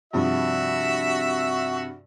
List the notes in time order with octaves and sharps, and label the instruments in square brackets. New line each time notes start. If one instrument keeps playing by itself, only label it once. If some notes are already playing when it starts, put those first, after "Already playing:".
[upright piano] G2 C3 F3 [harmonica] F#4 E5